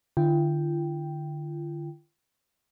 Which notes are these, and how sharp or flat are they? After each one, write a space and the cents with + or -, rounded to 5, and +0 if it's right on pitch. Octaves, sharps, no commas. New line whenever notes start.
D3 +30 F4 -40 G5 +0